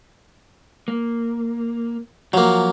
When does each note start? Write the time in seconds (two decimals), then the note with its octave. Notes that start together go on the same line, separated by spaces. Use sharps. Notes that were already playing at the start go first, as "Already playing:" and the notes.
0.88 A#3
2.33 F3 F#3 A#3